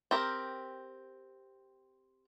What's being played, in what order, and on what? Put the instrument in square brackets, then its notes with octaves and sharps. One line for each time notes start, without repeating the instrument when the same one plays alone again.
[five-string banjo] C4 G4 A#4